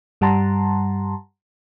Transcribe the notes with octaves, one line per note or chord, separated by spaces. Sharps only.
G2 G3 F#5 A5 A#5 C6